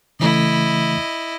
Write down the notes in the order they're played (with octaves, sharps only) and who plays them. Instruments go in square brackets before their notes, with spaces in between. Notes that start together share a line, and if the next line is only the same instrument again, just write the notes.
[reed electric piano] C#3 E3 A3 [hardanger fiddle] E4 D#5